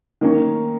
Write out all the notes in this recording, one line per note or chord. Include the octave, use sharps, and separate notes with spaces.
D#3 A#3 C#4